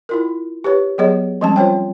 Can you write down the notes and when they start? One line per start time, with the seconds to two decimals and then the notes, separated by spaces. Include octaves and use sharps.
0.09 E4 F4 A#4
0.64 G4 B4 C#5
0.98 F#3 B3 G#4 C#5 D#5
1.41 F3 G3 G#3 C4 C#4 A5
1.56 F4 C5 C#5 G5